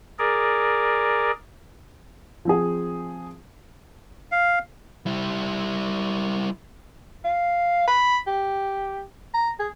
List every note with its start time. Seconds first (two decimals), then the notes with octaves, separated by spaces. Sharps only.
0.19 G#4 A#4 D5
2.45 F3 C4 G#4
4.32 F5
5.06 G3 E4
7.24 F5
7.88 B5
8.27 G4
9.34 A#5
9.60 G#4